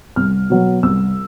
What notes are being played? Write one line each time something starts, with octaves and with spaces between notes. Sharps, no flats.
C2 F6
B2 F#3 B3
C2 E6